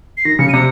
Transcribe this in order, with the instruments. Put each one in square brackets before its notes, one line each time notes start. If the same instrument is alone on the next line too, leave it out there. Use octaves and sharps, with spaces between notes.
[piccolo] C7
[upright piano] D#3 [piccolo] A#6
[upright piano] C#3 [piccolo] C#7
[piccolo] D#7
[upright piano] C3 [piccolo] C#7